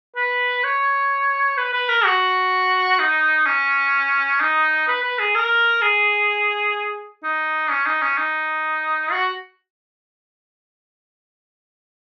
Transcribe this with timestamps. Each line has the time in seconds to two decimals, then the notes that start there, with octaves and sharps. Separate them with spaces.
0.16 B4
0.64 C#5
1.58 B4
1.73 B4
1.89 A#4
2.05 F#4
2.99 D#4
3.46 C#4
4.41 D#4
4.88 B4
5.03 B4
5.19 G#4
5.35 A#4
5.82 G#4
7.23 D#4
7.70 C#4
7.86 D#4
8.02 C#4
8.18 D#4
9.12 F#4